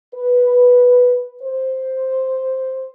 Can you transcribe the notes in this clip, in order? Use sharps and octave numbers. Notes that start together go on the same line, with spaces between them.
B4
C5